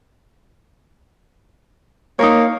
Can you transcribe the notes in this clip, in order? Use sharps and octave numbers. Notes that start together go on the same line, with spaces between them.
A#3 D#4 C#5